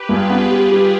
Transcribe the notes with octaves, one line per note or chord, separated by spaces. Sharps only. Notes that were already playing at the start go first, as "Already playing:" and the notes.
Already playing: G4 B4
G2 F4 G#4
B3
G3
G3